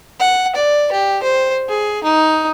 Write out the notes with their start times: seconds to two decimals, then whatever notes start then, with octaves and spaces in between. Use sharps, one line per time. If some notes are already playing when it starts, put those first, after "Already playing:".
0.20 F#5
0.56 D5
0.92 G4
1.23 C5
1.69 G#4
2.04 D#4